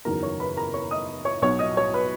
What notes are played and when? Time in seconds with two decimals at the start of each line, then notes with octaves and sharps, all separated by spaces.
0.05 F#1 E2 D#3 F#3 A#4 A#5
0.23 C#5 C#6
0.40 B4 B5
0.57 A#4 A#5
0.74 C#5 C#6
0.91 D#5 D#6
1.25 C#5 C#6
1.42 B1 B2 F#3 C#5 C#6
1.59 D#5 D#6
1.77 C#5 C#6
1.94 B4 B5